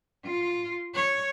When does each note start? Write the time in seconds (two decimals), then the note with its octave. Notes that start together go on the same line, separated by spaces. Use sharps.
0.25 F4
0.95 C#5